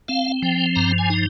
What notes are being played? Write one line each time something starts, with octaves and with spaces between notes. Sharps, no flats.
C4 F5
F3 G5
G2 A#5
G#5
D#4